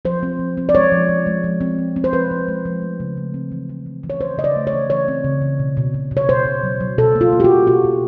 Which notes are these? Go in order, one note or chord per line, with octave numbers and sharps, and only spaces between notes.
F3 C5
C4
F3
C4
D5
G#3 C#5
F3
F3
G#3
F3
C4
F3
C4
C5
F3 B4
F3
G#3
F3
A3
C#3
A3
C4
E3
C4
E3
E3
C#5
E3 C5
C#3 D#5
D5
A3
C#5
E3
E3 C#5
C4
C#3
E3
B2
B2
B2
B2
C#5
B2 C5
B2
F#3
F#3
B2 A4
A#3
F4
A#3
G4
F#4
B2
B2 F#4
B2